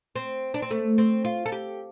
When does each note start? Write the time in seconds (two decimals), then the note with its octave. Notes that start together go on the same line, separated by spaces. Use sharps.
0.16 C4
0.54 D4
0.62 C4
0.71 A3
0.98 C4
1.25 F4
1.46 A4
1.52 G4